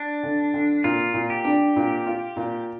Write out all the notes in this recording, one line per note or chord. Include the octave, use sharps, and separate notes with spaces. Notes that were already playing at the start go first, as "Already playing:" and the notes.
Already playing: D4
D3
D3
A#2 F4
A#2
G4
D4
A#2
F4
A#2